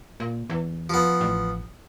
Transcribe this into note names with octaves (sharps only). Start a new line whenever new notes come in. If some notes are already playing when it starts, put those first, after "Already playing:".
A#2
E2
F3 B3
A1